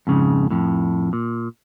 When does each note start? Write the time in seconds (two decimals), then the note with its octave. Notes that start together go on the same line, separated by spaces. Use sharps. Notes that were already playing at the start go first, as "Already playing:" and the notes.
0.07 F2 G#2 C#3
0.50 F2 A2
1.13 A#2